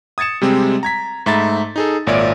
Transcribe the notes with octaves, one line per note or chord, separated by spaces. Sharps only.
D#6 G#6 A6 C#7 E7
C3 G3 G#3 C4
A#5 G#6 B6
G#2 A3 E5 A#5 B5 A6
D#4 G#4 A4
G#1 A#2 C#5 D5 E5 D7